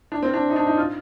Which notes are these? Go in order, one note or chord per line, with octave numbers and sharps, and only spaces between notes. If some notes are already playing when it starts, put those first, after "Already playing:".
D4
C4
D4
D#4
D4
D#4
F4